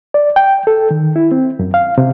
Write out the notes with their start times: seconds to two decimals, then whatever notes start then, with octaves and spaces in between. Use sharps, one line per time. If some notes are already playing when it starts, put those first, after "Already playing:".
0.14 D5
0.36 G5
0.67 A4
0.91 D#3
1.16 E4
1.31 C4
1.59 F#2
1.74 F5
1.98 C3